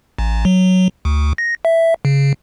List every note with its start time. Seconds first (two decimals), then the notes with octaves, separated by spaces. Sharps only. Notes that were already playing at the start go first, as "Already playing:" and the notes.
0.19 A1
0.45 F#3
1.05 D2
1.38 A#6
1.65 E5
2.05 C#3